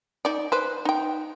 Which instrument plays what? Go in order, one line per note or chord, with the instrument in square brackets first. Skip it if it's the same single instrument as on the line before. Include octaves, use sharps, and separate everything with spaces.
[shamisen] D#4 D5
B4 C5
D#4 G5